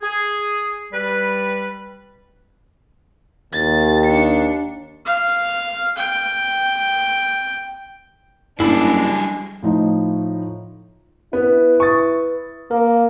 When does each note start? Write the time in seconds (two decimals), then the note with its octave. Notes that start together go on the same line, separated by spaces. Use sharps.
0.02 G#4
0.92 G3 B4
3.53 D#2 A6
4.05 D4 C#7
5.06 F5
5.97 G5
8.60 F#1 G3 D4 E4 G#4
9.63 A2 F3 D#4
11.33 B3 E4 B4
11.80 C#6 D#6 A6
12.71 A#3 A#4